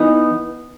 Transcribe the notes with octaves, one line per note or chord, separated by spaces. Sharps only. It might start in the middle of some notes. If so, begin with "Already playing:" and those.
Already playing: E3 B3 D#4